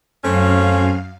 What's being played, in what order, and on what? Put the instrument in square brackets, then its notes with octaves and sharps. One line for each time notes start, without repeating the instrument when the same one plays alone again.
[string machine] F#2 F5 [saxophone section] A3 C4 C#4